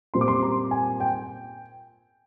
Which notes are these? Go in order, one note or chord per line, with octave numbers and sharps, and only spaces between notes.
A#2 G3 C4 C6
D6
C6
A#5
G#5
G5